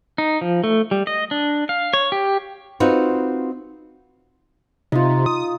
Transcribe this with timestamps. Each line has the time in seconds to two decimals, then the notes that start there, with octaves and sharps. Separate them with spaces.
0.18 D#4
0.41 F3
0.64 A3
0.91 G3
1.07 D#5
1.31 D4
1.69 F5
1.94 C#5
2.12 G4
2.80 C4 D#4 F4 F#4 B4
4.92 C3 D#4 F4
5.26 D#6